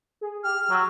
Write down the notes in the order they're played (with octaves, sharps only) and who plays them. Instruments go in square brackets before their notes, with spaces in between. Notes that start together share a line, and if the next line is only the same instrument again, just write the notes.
[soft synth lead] G#4
[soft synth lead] G4 [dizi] F6
[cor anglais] F#3 [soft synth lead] E6